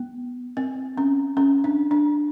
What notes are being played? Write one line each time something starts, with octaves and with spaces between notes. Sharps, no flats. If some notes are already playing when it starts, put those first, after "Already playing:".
Already playing: B3
C4
C#4
C#4
D4
D4